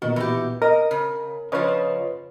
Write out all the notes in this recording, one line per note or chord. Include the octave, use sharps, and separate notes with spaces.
A#2 D#3 B3 F#4
E3 G4
A#4 D#5
C#3
C#3 F3 B4 C#5 D#5